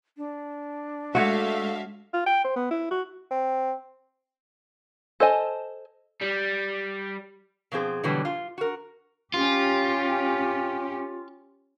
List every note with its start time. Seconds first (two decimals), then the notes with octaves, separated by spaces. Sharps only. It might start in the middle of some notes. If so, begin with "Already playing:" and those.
0.17 D4
1.15 G#3 A3 F#4 C#5 E5 F5
2.14 F4
2.26 G5
2.44 C5
2.56 B3
2.70 E4
2.91 F#4
3.31 C4
5.20 A4 C5 D#5 G#5
6.21 G3
7.72 B2 F3 C4 G#4
8.03 B2 D3 E3 F#3 G3
8.25 F4
8.58 F#4 A#4
9.34 C#4 F4 G4